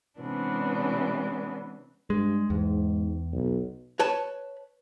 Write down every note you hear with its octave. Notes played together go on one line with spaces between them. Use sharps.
C3 E3 G#3 B3 C#4 D4
G2 G#3
E2 G#2
B1
B4 C#5 A5